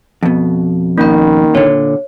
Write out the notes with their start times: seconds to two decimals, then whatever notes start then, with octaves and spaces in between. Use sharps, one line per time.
0.23 F2 B2
0.98 D#3 A#3 C#4 B5
1.55 A#2 D3 C#5